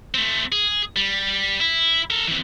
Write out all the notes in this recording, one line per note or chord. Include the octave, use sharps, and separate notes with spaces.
A3 C4
G#4
G3
E4
A4 A#4
E3 C4